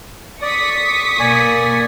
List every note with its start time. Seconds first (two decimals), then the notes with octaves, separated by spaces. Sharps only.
0.42 D5 C#6 D#6 B6
0.88 D6
1.19 B2 A#3 D5 G#5